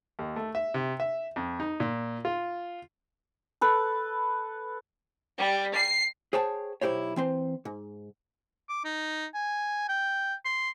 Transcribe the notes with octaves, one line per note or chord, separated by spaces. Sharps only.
D#2
A3
E5
C3
E5
F2
D#4
A#2
F4
A4 B4
G3
C7
G#4 C5 C#5 G5 A5
B1 E4 G4 C5 C#5
E3 C4 C5
G#2
D6
D#4
G#5
G5
C6